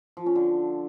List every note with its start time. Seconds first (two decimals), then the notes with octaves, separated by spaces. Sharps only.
0.17 F3
0.26 C#4
0.36 D3